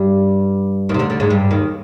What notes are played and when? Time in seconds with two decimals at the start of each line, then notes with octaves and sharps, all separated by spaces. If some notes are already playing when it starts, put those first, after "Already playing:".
Already playing: G2 G3
0.89 D#2 D#3
0.94 C3
0.99 D2 D3
1.10 D2 D3
1.20 G#2 G#3
1.30 G2 G3
1.51 D#2 D#3